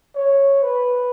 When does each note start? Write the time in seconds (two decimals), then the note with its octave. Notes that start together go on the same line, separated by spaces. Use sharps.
0.15 C#5
0.62 B4